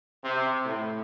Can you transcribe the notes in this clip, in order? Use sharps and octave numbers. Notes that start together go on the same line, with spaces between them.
C3
A2